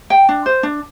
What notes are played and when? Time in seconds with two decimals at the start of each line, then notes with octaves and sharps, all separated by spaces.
0.10 G5
0.29 D4
0.46 C5
0.63 D4